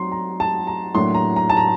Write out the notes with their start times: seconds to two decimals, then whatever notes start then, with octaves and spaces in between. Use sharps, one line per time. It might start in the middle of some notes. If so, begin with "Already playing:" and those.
Already playing: F#3 C4 D#4 A#5 C6
0.12 A#5
0.40 A5
0.67 A#5
0.94 A2 F#3 A#3 D4 C6
1.15 A#5
1.36 A#5
1.50 A5
1.57 A#5